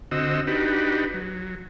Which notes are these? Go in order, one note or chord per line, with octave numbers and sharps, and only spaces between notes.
D3 C4 F#4 D#5 E6
D4 D#4 F#4 G4 B4
F#3